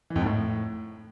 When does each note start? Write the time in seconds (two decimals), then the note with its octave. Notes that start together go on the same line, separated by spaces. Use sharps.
0.10 E3
0.16 F2
0.21 G#2
0.26 A2